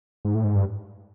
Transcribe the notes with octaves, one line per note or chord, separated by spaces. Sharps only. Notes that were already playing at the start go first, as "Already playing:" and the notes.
G#2
A2
G#2
G2